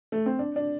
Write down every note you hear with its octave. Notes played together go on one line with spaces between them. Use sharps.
A3
C4
D4
D4